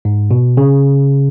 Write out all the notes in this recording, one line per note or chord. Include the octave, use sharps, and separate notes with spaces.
G#2
B2
C#3